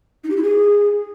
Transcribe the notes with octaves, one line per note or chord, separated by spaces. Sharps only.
D#4
G4
E4
G#4